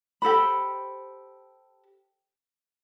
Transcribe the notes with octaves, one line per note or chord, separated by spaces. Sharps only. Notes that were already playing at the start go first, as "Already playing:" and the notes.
G4 A4 C5 B5